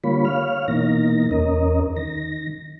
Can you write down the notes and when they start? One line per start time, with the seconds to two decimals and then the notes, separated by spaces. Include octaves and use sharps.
0.04 D3 G3 A#3 F4 C#5 B5
0.25 C#5 F5 F6
0.68 B2 E3 A#3 D#4 A#6
1.31 E2 C#4 A#4 D#5
1.96 D#3 A#6